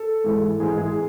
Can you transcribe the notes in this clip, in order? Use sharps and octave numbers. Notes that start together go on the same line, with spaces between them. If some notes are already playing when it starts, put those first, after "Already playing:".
Already playing: A4
G#2 E3 G#3
G#2 E3 G#3 G#4
G#4